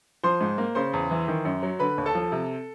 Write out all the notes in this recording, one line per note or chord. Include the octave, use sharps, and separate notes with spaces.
F3 C5 C6
G#2
A#3
C#3 C5 C6
E2
E3
D#3
F#2
F#3
D3 B4 B5
D#2
A4 A5
F3
C3